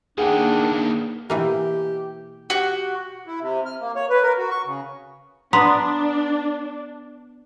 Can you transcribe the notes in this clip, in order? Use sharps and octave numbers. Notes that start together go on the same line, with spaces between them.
D#3 A#3 B3 D4 G#4 F#5 G5
B2 E3 A#3 G4
F#4 G4
E4
C3
F6
A#3
C#5
B4
A#4
F#4
C#6
C#3
B3 D4 A#5 C6 D#6 B6